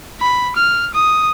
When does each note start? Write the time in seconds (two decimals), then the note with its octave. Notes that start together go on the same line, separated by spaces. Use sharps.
0.21 B5
0.56 F6
0.94 D#6